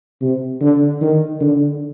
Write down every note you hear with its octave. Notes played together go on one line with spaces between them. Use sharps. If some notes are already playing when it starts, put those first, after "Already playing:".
C3
D3
D#3
D3